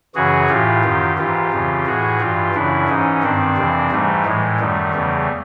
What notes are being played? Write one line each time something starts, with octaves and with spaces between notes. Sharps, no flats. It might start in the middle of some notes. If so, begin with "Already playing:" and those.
F#2 C#3 E3 F#4 G#4
A2 E3 F4 G4
F#2 D#3
G#2 E3 F4 G4
F2 C#3 E3
A2 E3 F#4 G#4
G2 E3 F4 G4
F#2 C#3 E3 D4 E4
G#2 E3 C#4 D#4
G2 D#3 C4 D4
F2 C3 E3
G#2 E3 G3 A3
A2 E3 G#3
F#2 D#3 G3 A3
E2 C#3 E3